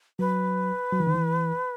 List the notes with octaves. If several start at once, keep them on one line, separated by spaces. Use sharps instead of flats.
F#3 B4
F#3
E3
D#3
E3